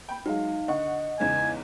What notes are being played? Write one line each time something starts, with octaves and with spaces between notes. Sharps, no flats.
G5 B5
F#3 G#3 D#4 F5
D3 D#5 F#5 C#6
E2 G#2 C#3 G#5